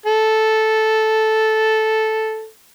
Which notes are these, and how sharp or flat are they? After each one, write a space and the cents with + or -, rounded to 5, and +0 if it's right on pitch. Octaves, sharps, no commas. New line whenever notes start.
A4 -5